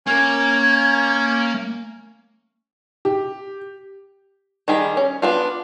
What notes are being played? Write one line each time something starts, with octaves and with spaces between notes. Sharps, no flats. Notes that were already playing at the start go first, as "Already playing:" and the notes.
A#3 C#4 A#4 G#6
G4
D#3 G3 G#4 B5
C#4
B3 D4 F4